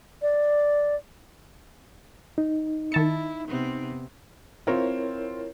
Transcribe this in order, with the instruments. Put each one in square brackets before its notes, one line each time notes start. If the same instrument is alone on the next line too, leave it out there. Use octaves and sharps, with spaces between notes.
[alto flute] D5
[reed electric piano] D#4
[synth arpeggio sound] D#3 A5 C#7 [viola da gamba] E4
[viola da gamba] C3 B3 C4
[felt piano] C4 F4 [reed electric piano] E4 A#4 C#5